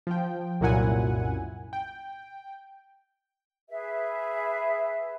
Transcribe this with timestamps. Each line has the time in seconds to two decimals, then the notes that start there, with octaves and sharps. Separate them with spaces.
0.07 F3 G5
0.61 C2 F#2 A#2 E4 F#5 G#5
1.73 G5
3.68 G#4 B4 E5